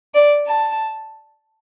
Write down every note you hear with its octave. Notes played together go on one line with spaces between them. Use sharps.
D5
A5